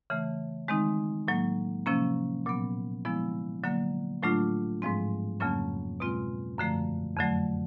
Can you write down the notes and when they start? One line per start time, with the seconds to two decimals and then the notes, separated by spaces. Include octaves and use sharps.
0.10 C#3 E3 A3
0.68 D#3 G#3 C4 D#4
1.28 A2 F#3 A#3
1.86 C3 F3 A#3 C#4
2.46 A#2 F#3 B3
3.05 D3 F3 G#3 B3 E4
3.64 D3 F#3 A#3
4.23 A2 F#3 A3 D4 F4
4.82 G#2 F3 G#3 C4
5.40 F2 C#3 F#3 A#3 C#4
6.00 B2 G#3 C4 F4
6.58 F#2 D3 F3 A3
7.17 F2 D3 F#3 A3